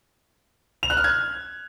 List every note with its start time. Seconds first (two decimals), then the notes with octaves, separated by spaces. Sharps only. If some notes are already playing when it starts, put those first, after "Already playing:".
0.83 F7
0.90 F#6
0.97 F6
1.04 G#6